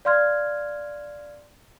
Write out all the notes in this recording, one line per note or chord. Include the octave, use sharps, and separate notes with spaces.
D5 F5 C6 F6 G#6